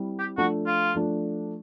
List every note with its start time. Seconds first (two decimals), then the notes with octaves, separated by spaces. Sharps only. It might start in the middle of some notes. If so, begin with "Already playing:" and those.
Already playing: G3 C4 E4
0.19 G4
0.38 F3 A3 D4 F#4
0.66 F4
0.95 F3 A3 D4